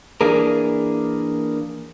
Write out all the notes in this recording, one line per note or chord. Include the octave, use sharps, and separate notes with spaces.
E3 A#3 D4 G#4 A#4